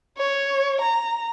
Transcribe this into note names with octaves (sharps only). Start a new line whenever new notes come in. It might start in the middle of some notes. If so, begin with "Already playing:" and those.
C#5
A#5